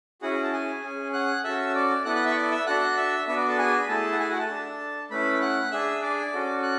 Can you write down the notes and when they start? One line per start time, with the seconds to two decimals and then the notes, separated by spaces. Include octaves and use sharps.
0.22 C#4 E4 F#4 G#4 F#5
0.44 A5
0.53 G#4 G#5
0.83 C#4 G#4
1.13 F#5 F#6
1.44 C#4 F#4 A4 E5 E6
1.75 D5 D6
2.05 B3 E4 A4 F#5 F#6
2.16 F#5 F#6
2.26 E5 E6
2.32 C#6
2.36 D5 D6
2.51 E5 E6
2.66 D4 F#4 A4 F#5 F#6
2.97 E5 E6
3.27 B3 D4 F#4 E5 E6
3.37 D5 D6
3.48 A4 A5
3.58 G#4 G#5
3.81 B5
3.88 A3 E4 G#4 A4 A5
4.12 F#5
4.19 G#4 G#5
4.29 F#4 F#5
4.39 A4 A5
4.50 D4 A4
5.11 A3 C#4 E4 B4 B5
5.42 F#5 F#6
5.72 D4 G#4 E5 E6
6.02 D5 D6
6.33 C#4 F#4 A4
6.63 F#6